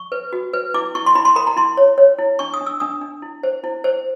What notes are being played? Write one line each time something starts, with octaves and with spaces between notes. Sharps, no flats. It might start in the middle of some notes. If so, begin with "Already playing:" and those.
Already playing: C#6
B4
F#4
B4
E4 D6
E4 C#6
C6
E4 B5
C6
A#4 B5
A#5
E4 C6
C#5
C#5
E4
D4 C#6
D#6
D4
E6
D4 D#6
D4
E4
C5
E4
C5